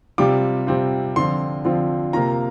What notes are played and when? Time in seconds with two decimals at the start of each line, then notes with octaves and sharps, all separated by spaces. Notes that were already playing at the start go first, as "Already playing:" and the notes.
0.18 C3 G3 C4 F4 D6
0.67 C3 G3 C4 F4
1.16 D3 F3 C4 F4 C6
1.65 D3 F3 C4 F4
2.13 C3 A#3 F4 A#5